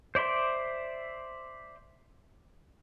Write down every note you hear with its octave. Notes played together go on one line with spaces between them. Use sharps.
C5 D5 E5 C6